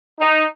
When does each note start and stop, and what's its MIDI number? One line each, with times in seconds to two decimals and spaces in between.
0.19 0.44 63